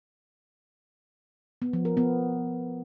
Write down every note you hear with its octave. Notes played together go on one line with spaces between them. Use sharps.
B3
F3
A#4
B3